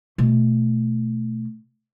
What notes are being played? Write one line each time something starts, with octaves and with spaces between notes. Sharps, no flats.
B2 A3